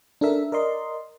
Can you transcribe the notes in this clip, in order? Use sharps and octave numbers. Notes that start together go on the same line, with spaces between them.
D4 A4 A#4 E5
A#4 D5 D#5 C6